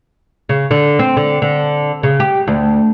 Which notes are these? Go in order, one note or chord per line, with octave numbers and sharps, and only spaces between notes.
C#3
D3
C4
D3
D3
C#3
G4
D2